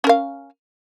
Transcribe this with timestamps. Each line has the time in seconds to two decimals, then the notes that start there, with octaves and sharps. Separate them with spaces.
0.04 C#4
0.07 A#4
0.09 F5